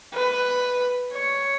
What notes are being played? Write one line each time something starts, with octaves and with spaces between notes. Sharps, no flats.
B4
C#5